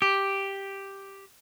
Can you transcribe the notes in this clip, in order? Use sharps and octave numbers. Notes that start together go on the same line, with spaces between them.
G4